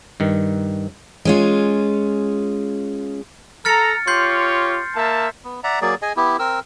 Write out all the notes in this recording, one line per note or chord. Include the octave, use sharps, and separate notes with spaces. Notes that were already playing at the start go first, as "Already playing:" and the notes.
G2 D#3
G#3 C#4 F4
A4 A#5 F6 A6 C#7
F4 G4 C#5 C6 G6 C7
A#3 E5 A5
B3
D5 E5 F#5 A#5
F#3 A#3 G#4 D5
G#4 D#5 G#5
B3 E4 G4
C4 A#4 E6